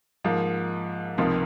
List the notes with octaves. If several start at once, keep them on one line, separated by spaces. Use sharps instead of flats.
G#2 F3 A#3
C#2 C3 F3 A#3 D#4